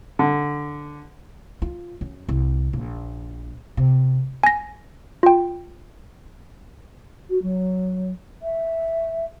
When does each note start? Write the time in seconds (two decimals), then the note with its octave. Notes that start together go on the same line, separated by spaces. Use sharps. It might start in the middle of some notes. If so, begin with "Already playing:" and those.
0.19 D3
1.62 F4
2.01 F#2
2.28 C2
2.73 A#1
3.77 C3
4.43 G#5 A#6
5.23 F4 G5
7.29 F#4
7.42 F#3
8.42 E5